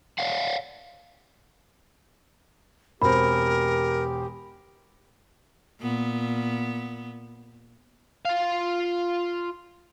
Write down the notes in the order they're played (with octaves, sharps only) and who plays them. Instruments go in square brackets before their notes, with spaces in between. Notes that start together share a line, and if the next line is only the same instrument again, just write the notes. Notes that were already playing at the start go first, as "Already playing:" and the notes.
[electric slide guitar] C#5 D5 F5 F#5
[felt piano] E1 C4 [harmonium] G4 [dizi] A#4 [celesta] B5
[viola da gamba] A#2 B3
[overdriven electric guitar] F4 F5